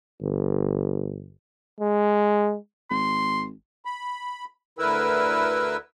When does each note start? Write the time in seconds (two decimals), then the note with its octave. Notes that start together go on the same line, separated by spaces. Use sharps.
0.21 G1
1.81 G#3
2.90 G#1 C6
3.85 B5
4.79 D2 D3 E4 A#4 B4 E6